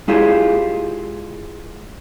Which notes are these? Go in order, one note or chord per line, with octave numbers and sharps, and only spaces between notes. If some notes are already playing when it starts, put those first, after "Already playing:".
G#3 E4 F4 G4 G#4